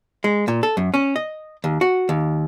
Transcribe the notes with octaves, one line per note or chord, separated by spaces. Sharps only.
G#3
A#2
A4
F#2
C#4
D#5
D#2
F#4
D#2